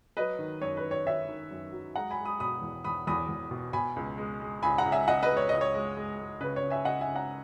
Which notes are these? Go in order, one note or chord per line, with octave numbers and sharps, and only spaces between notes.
F#3 B4 D#5
D#3
F#2 C#5
B4
D#3
C#5
D#3 C#5 E5
D#3
F#2
F#3
G#3 F#5 A#5
G#5 B5
G#3
B5 D#6
B2 B5 D#6
E2
E2 B5 D#6
E2 B5 D#6
E2
B2
B2 G#5 B5
C#2
G#3
G#3
C#2 G#5 B5
F#5 A#5
C#2
E5 G#5
C#2 D#5 F#5
B4 D#5
G#3
C#5
C#2 D#5
C#5
G#3
G#3
G#3
C#3 B4
C#5
C#3
E5 G#5
C#3 D#5 F#5
E5 G#5
C#3
F#5 A#5